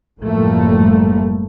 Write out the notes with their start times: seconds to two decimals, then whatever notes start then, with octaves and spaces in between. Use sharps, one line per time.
0.19 F#1 A2 F3 G3 A3 A#3